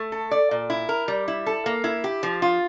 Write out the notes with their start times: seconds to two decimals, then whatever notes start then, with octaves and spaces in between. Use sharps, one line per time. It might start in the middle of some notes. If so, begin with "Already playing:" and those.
Already playing: A3
0.12 A4
0.31 D5
0.51 A#2
0.70 E4
0.89 A#4
1.08 G3
1.28 E4
1.46 A4
1.66 A#3
1.84 E4
2.04 G4
2.23 F3
2.42 F4